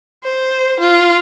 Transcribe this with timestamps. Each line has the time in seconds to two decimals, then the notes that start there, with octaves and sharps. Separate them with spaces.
0.24 C5
0.80 F4